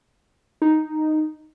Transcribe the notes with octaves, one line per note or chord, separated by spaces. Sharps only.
D#4